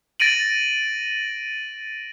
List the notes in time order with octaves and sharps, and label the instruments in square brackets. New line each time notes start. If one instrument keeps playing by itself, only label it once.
[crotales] A6 A#6 D7 D#7 F#7